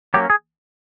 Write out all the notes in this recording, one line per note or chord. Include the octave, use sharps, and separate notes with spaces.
F#3 A#3 C#4 G4
G#4